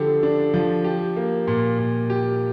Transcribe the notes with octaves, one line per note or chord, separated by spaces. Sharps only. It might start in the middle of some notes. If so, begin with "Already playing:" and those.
Already playing: D3 F3 D4 G4
D4
F3
G4
A#3
A#2
A#2
G4